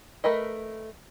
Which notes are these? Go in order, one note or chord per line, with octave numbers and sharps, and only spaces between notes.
A3 A#4 B4 D#5